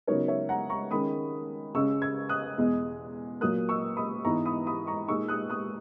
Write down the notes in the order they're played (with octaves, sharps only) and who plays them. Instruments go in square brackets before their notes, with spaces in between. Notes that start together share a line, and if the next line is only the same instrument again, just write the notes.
[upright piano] C#3 F#3 B3 D#4 A#4 C#5
C#5 E5
F#5 A#5
A#5 C#6
D#3 G#3 C#4 B5 D#6
C#3 G#3 C#4 C#6 E6
E6 G#6
D#6 F#6
E2 B2 G#3
A#2 F#3 A#3 D#6 F#6
C#6 E6
B5 D#6
G#2 E3 B3 D#4 A#5 C#6
B5 D#6
B5 D#6
A#5 C#6
A#2 G#3 D#4 C#6 E6
D#6 F#6
D#6 F#6